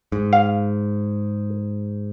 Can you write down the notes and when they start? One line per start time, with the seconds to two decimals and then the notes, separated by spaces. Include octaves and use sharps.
0.12 G#2
0.33 F5